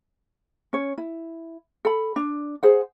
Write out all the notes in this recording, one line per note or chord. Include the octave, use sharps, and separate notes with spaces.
C#4 C#5
E4
A4 B5
D4
G#4 C5 F#5